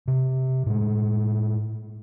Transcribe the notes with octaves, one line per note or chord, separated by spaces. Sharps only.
C3
A2 G#3